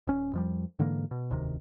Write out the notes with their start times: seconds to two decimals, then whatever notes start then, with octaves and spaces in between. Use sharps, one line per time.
0.07 D#1 C#4
0.33 F2 F3 G3
0.79 G#2 D3 E3 A#3
1.11 B2
1.30 E1 D2 C3 D#3